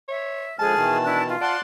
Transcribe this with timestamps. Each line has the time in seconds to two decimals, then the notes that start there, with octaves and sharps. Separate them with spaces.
0.08 C#5 E5
0.59 D3 F3 G#3 G#4 G#5 A5 F6
0.74 B2 D#3 E3
1.04 D4 E4 F#6
1.29 F4
1.41 D5 F#5 A5 C6